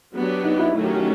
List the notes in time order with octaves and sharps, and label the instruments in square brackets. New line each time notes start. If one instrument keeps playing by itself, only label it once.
[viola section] F#3 B3 D4 G4
[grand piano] D#4
E4
[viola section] D#3 F#3 A3 C#4 [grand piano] E4
[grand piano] G4
F#4